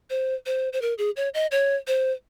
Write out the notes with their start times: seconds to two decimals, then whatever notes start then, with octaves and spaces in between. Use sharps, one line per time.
0.10 C5
0.46 C5
0.73 C5
0.82 A#4
0.98 G#4
1.16 C#5
1.34 D#5
1.51 C#5
1.87 C5